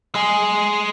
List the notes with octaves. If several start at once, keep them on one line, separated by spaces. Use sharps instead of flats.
G#3 G#4